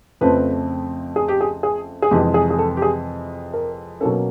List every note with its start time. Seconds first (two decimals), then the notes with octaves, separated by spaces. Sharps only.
0.21 F2 C#3 F3 A3 C4 B4
1.16 G#4
1.28 G4
1.41 G#4
1.63 G#4
2.02 G#4
2.11 F2 C3 E3 G#3 G4
2.34 G#4
2.50 G#4
2.58 A4
2.77 G4
2.82 G#4
3.54 A#4
4.00 B2 F#3 A#3 C#4 A4